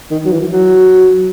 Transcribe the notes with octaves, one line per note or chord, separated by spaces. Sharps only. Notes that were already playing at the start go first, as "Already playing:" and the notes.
D#3
F#3
E3
F#3